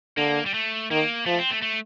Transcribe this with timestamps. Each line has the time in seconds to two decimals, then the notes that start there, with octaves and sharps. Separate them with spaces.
0.18 D3 A#3
0.46 G3
0.54 A3
0.91 D#3 A#3
1.26 F3 A3
1.39 C4
1.51 A3
1.62 A3